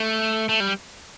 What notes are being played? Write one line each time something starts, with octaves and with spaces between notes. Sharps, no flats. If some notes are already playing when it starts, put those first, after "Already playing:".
Already playing: A3
A3
G3